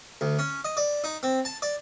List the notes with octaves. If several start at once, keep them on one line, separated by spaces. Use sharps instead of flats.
D2
C#4
D#5
D5
D#4
C4
A5
D5